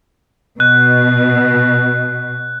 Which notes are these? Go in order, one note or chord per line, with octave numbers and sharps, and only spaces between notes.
B2 F#6